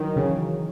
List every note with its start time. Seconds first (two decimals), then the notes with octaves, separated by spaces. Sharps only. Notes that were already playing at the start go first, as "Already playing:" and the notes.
Already playing: D#3 E3 F#3
0.16 C#3